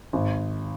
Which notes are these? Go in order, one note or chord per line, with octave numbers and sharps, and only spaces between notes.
G#1